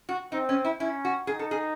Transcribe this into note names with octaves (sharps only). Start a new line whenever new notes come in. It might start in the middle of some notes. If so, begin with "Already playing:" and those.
F#4
C4 D#4
C#4
E4
C#4 E4
F#4
D#4 G#4
A4
G#4